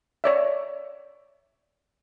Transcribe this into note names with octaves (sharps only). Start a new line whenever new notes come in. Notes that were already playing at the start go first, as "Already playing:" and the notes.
C#5 D5 E5